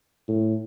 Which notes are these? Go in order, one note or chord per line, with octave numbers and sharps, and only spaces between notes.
A2